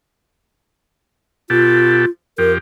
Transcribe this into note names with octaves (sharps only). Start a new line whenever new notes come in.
B2 F4 G4 A4
F2 G4 A#4